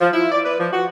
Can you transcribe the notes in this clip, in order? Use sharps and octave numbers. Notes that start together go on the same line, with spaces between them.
F3
E4
D5
B4
F3
F#4